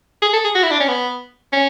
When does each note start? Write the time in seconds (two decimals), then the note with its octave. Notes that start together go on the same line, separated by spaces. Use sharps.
0.22 G#4
0.33 A4
0.44 G#4
0.55 F#4
0.63 E4
0.71 D4
0.80 C#4
0.88 B3
1.53 C#4